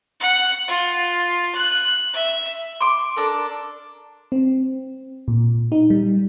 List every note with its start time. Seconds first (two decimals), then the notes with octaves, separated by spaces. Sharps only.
0.20 F#5
0.68 F4
1.55 F#6
2.13 E5
2.80 C6 D6
3.16 D4 A4 A#4
4.32 C4
5.28 A#2
5.72 D#4
5.90 G3